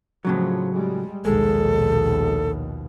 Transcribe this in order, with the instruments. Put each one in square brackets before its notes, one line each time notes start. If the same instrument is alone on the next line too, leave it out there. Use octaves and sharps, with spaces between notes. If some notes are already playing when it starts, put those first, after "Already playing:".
[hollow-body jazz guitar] A2 C#3 F#3 [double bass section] F3
[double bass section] G3 G#3
[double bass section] A#1 D#2 B2 [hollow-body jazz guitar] G#3 [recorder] A4